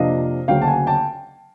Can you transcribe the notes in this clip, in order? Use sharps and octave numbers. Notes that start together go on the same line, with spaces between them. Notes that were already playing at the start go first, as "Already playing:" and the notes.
Already playing: F2 C3 F3 A#3 D4 D#5 F5
D2 C#3 F#3 A#3 F5 G5
A5
F#5 G#5
G5 A5